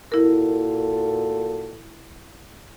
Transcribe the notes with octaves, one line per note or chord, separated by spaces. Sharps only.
A#2 E4 F#4 A4 A#4